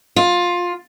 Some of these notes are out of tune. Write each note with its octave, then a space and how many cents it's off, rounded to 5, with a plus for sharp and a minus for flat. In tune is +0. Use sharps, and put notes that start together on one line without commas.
F4 +15